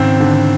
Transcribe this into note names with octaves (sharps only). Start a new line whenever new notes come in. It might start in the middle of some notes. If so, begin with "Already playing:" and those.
Already playing: G#1 C#3 C4
D3